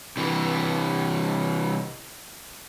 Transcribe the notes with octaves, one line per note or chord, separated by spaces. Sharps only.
C3 E3